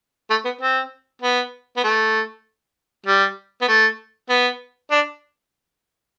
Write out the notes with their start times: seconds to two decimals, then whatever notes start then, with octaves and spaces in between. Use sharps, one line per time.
0.30 A3
0.45 B3
0.61 C4
1.22 B3
1.76 B3
1.84 A3
3.06 G3
3.61 B3
3.68 A3
4.29 B3
4.91 D4